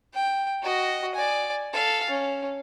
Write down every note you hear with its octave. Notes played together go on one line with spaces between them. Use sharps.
G5
F#4 D#5
D5 G#5
A4 F5
C#4